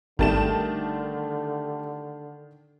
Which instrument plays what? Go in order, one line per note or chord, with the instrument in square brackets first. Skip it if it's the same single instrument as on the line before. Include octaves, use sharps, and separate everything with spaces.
[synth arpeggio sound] G#1 [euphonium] D3 [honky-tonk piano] D#3 A5 E7 [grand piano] G3 A3